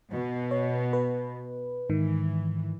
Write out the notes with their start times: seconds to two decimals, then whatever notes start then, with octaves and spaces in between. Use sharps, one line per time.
0.12 B2
0.51 C#5
0.93 B4
1.90 G#2 D#3 E3